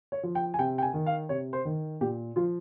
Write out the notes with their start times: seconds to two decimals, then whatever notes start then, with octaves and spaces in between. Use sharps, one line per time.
0.12 C#5
0.23 F3
0.35 G5
0.54 G#5
0.59 C3 G5
0.78 G5
0.82 G#5
0.94 D#3
1.06 F5
1.29 C3 C#5
1.53 C5
1.65 D#3
2.01 A#2 G4
2.36 F3 F4